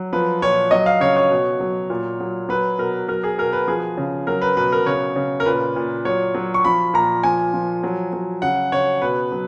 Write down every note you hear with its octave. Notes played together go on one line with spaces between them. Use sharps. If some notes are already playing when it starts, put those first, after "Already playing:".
Already playing: F#3
F3 B4
A#2 C#5
F#3 D#5
F5
C#3 C#5
C#5
B2
F#3
A#2
F#3
F#3 B4
B2 A#4
F#3 A#4
G#4
B2 A#4
B4
F3 G#4
C#3
F#3 A#4
B4
B2 B4
A#4
C#3 C#5
C#3
A#4
A#2 B4
A#2
F#3 C#5
F#3
C#6
F3 B5
A#2 A#5
F3 G#5
F3
F#3
F#3
C#3 F#5
C#3 C#5
B2 B4
F#3